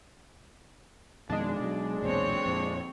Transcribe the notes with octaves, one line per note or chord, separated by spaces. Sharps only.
F2 B2 D#3 G#3 D4
B2 F#3
B1 E2 A#2 C4 C#5
F2 A#2